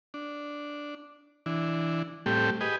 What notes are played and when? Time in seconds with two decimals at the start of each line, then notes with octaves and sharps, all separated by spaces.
0.14 D4
1.46 E3 D4
2.26 A2 G3 A3 C4 G4
2.61 G4 G#4 B4 D#5